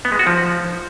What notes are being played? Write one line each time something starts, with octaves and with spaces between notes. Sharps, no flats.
B3
G#3
F#4
F3